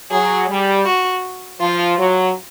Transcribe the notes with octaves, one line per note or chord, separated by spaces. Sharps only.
F#3 G#4
G3
F#4
F3 F4
F#3